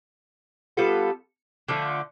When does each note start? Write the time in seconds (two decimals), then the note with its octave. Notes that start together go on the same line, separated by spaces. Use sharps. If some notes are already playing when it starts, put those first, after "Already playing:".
0.77 G3 B3 F4 A4
1.69 D3 F3 A3